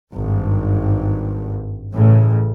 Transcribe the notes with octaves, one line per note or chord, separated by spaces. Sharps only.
G#1 G2
A1 A2 C#3